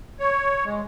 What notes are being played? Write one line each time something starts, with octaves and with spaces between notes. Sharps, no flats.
C#5
G#3